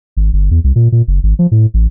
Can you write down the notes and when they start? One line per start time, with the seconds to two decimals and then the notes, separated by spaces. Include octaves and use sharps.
0.17 G#1
0.33 G1
0.51 E2
0.64 C2
0.76 A#2
0.92 A#2
1.08 F#1
1.23 G#1
1.39 F3
1.51 A2
1.74 A1